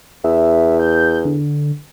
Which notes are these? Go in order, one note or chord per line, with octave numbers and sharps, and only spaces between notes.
E2 E5
G6
D3